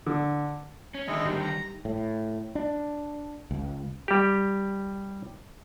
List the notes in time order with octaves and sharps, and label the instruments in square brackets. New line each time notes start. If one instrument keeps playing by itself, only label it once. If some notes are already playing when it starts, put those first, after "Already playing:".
[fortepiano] D3
[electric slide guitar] C#4
[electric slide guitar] F#2 D3 D#3 [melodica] G#3 E4 D#5
[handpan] G3 D#4 G4 [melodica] A#4 C5
[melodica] A#5
[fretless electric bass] A2
D4
C#2
[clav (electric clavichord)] G3 G4